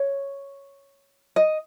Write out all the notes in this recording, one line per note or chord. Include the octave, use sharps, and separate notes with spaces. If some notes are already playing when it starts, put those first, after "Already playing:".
Already playing: C#5
D#5